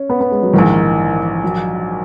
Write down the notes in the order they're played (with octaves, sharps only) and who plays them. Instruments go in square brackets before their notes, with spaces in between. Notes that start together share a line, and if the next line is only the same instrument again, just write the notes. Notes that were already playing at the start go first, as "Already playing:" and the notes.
Already playing: [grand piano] C#4
B3
B3
G#3
F#3
[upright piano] A#1 G#2 D#3 [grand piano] E3
[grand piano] F#3